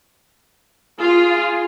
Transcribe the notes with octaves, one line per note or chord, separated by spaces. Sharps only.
F4 G#4